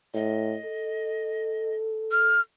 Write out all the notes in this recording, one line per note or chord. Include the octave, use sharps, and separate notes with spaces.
A2 D#5
A4
F6